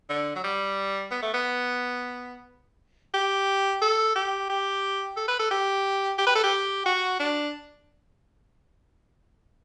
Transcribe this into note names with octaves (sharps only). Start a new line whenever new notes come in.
D3
F#3
G3
B3
A3
B3
G4
A4
G4
G4
A4
B4
A4
G4
G4
B4
A4
G4
F#4
D4